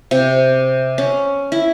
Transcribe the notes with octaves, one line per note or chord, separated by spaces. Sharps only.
C3
C#4
E4